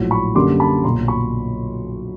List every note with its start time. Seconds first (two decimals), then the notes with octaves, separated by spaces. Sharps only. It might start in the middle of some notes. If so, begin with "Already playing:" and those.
Already playing: A#1 A2 F#3
0.11 B5 C#6
0.35 F#2 D3 G3 A#3 C6 D6
0.60 A5 B5
0.84 B1 A#2 F#3 A#5 C6
1.08 B5 C#6